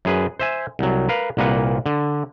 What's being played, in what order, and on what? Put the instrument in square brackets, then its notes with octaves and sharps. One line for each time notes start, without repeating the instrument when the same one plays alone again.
[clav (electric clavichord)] F#2 G#4 B4
C5 E5 G#5
C2 F#3
A#4 B4 F5
C2 A#2 A#3 B4 F#5
D3